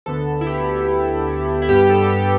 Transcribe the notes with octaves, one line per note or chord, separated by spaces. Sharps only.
D2 D3 B3 A4
E4
G4
E4
G2 G3 B3 G4
A4
G4